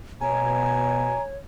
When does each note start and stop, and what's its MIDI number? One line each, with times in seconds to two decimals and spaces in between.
0.21 1.14 47
0.21 1.36 73
0.21 1.23 80
0.21 1.22 82